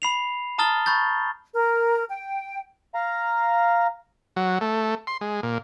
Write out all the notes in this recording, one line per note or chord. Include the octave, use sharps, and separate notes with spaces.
B5 C7 F7
A5 A#5 D#6 F6 A6 G7
B5 C#6 G6 A6
A#4
G5
F5 A#5
F#3
A3
C6
G#3
A#2